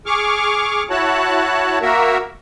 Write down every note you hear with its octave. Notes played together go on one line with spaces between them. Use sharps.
G#4 C#6 D6 F6
E4 F#4 C#5 A5 F#6
A#3 F#4 A#4 E5